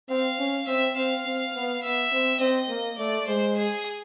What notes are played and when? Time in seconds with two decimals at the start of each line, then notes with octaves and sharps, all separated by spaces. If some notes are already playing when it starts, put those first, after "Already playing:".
0.09 C4 F5
0.39 C#4
0.67 C4 E5
0.96 C4 F5
1.25 C4
1.54 B3
1.83 B3 E5
2.12 C4
2.40 C4 D#5
2.69 A#3
2.97 A3 D5
3.27 G#3 C5
3.56 G#4